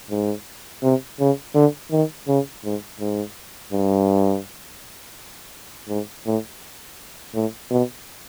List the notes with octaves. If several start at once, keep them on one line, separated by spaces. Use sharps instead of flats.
G#2
C3
C#3
D3
D#3
C#3
G#2
G#2
G2
G#2
A2
A2
B2